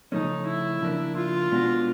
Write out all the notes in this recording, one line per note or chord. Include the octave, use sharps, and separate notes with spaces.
C#3 F3 A3 C#4 D#4
E4
C#3 F3 A#3 D4
F4
B2 G#3 B3 D4 F#4